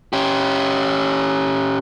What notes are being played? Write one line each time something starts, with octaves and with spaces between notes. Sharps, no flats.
C#4 G4